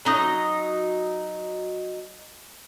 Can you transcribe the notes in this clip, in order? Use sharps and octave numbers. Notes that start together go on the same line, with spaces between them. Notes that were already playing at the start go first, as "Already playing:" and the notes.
F#3 D#4 D#5